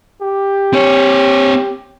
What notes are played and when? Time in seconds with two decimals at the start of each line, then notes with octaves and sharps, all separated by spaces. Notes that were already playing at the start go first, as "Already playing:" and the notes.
0.22 G4
0.73 C4 C#5